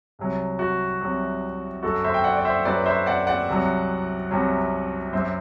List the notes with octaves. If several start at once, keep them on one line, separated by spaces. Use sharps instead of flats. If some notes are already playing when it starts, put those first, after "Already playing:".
C2 C3 F#3
F#4
C2 C3 F#3
F#2 F#3 F#4 A4
C5 E5
G5
D5 F#5
D5
C5 E5
F#2 F#3 B4 D5
C5 E5
D5 F#5
D5 F#5
C2 C3 F#3
C2 C3 F#3
F#2 F#3 C5 E5